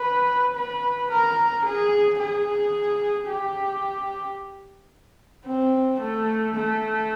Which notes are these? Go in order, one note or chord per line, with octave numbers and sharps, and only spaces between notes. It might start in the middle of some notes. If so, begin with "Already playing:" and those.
Already playing: B4
B4
A#4
G#4
G#4
G4
C4
A3
A3